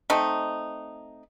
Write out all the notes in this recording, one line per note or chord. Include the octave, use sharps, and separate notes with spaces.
A3 C4 D#4